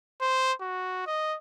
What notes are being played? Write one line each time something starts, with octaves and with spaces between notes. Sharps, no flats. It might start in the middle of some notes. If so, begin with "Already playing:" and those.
C5
F#4
D#5